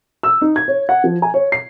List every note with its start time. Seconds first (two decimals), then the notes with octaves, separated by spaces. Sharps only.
0.23 E6
0.41 D#4
0.56 G#6
0.68 C#5
0.89 F#5
1.04 F3
1.22 G#5
1.34 C#5
1.52 C7